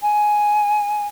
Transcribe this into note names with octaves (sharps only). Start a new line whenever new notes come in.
G#5